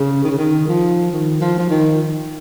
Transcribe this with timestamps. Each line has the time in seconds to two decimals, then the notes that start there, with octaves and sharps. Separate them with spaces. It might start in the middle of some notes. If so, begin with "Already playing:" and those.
Already playing: C#3
0.24 D#3
0.31 C#3
0.38 D#3
0.68 F3
1.11 D#3
1.41 F3
1.58 F3
1.70 D#3